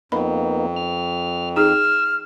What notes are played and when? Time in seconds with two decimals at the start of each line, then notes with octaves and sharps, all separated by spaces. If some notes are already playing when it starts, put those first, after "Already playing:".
0.12 F2 A#3 B3 D#4 B5
0.76 F6
1.56 D#4 G#4 E6 F6